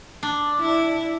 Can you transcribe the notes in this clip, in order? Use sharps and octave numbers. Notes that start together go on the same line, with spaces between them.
D4
E4